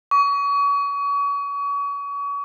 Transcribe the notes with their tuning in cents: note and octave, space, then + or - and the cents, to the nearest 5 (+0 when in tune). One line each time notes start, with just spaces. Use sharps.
C#6 +35